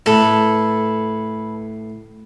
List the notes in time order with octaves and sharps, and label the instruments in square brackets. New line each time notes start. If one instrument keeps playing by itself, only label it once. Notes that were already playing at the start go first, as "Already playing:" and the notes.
[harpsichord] A2 [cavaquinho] A4 B4